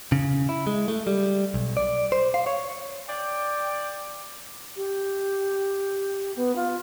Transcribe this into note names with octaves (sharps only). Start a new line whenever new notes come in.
C#3
E4
G#3
A3
G3
B1
D5
C5
F5
C#5
D5 G5
G4
B3
F4